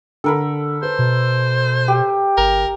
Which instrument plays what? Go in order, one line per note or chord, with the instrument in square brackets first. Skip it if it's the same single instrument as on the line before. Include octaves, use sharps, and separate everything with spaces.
[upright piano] D3 [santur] A4 A#4 B5
[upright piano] B4 [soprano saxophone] C5
[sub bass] B2
[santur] G4
[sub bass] G1 [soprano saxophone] A#4